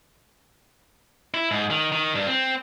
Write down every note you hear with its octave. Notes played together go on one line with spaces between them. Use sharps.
E4
G#2
D#3
D#3
G2
C4